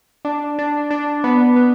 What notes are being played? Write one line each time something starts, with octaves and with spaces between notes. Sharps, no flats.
D4
D4
D4
B3
B3